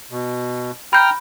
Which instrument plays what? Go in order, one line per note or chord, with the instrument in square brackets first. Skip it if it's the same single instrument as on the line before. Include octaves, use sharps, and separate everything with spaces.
[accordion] B2
[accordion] G5 A#5 F6 [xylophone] B5 G6